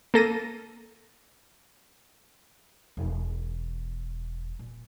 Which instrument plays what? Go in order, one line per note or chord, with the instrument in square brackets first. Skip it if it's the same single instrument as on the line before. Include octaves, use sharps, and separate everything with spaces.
[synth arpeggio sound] A#3 A4 A#6 D#7
[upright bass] E1
A#2